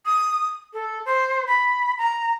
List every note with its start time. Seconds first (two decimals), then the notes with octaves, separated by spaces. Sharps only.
0.06 D#6
0.73 A4
1.06 C5
1.47 B5
1.98 A#5